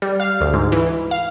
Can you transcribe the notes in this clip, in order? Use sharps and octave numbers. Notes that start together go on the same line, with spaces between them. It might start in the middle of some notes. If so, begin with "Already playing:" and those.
G3
F5
D2
G#2
E3
F5